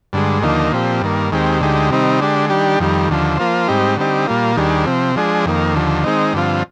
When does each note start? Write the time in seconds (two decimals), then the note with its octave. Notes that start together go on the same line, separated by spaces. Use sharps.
0.13 G2 D3 G#3
0.42 D#2 D3 F3 A#3 D#4
0.72 A#2 F3 C4 G4
1.01 G2 D#3 A#3
1.31 D#2 D#3 G#3 C4 G4
1.61 D2 D3 G#3 D#4 G4
1.90 C3 D#3 G3 C4 D#4
2.20 D3 G#3 D4 G4
2.50 D#3 G3 D4 G4
2.80 F2 D#3 G3
3.09 D#2 D3 F3
3.38 F3 A#3 F4 C5
3.68 G#2 G3 C4 D#4 G4
3.97 D3 G3 C4 D#4 G4
4.27 A#2 G3 A#3 F4
4.56 D#2 D#3 G3 D4 G#4
4.86 C3 F3 C4
5.16 F3 G#3 D4 G#4
5.46 F2 D#3 A#3
5.75 D#2 D3 F3
6.04 D#3 G#3 C4 D#4
6.33 G2 D3 F3 C4 F4